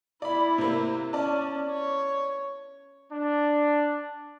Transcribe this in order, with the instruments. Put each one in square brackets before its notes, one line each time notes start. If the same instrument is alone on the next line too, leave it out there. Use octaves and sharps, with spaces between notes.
[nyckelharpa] E4 [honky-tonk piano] D5 B5
[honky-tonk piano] C3 A#3
[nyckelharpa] C#4 [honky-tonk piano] D5 A5
[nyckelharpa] C#5
[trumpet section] D4